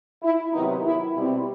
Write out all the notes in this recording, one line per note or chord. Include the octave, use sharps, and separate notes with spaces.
E4
C3 D#3 F#3 B3 D#4
E4
B2 G3 C4 E4